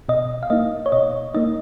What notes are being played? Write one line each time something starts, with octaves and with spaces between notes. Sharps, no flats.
B2 D#5
F5
A#3 D#4 D#5
C#5
B2 D#5
A#3 D#4 D#5